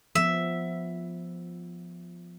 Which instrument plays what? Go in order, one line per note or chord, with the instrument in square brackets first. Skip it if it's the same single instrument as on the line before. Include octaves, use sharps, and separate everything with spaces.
[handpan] F3 B3 [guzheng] E5